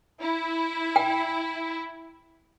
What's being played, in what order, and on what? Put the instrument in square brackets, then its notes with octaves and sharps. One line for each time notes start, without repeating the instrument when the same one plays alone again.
[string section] E4
[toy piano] G5